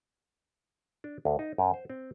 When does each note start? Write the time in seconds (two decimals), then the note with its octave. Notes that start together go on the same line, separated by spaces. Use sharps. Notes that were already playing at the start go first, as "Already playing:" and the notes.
1.04 D4
1.25 D2
1.39 D#4
1.58 F#2
1.74 C5
1.90 C4